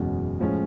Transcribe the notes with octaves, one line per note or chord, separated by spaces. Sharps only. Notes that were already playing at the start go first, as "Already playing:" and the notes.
Already playing: F#1 E2 B2 G#3 C#4
A2 F3 G#3 C#4